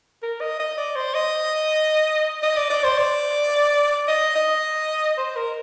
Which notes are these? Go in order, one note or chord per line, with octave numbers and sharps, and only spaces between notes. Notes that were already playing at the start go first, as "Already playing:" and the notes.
A#4
D#5
D#5
D5
C5
D#5
D#5
D5
D5
C5
D5
D#5
D#5
C5
A#4